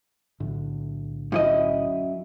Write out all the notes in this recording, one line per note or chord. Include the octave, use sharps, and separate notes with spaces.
B1 A2 D3
F#2 E4 D#5